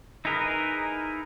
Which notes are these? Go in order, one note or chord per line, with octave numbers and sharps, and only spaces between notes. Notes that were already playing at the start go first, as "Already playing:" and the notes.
D#4 E4 G#4 A#4 B4